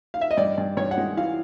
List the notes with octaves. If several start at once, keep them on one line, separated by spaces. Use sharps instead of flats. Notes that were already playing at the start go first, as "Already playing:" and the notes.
F5
E5
D#5
G2 D5
G2
G2 C#5
F#5
G#3
E3 F5